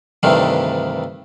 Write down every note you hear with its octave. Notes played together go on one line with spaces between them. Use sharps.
D2 G2 C3 D#3 E3